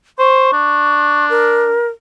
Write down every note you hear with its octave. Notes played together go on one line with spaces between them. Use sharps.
C5 C#6
D4
A#4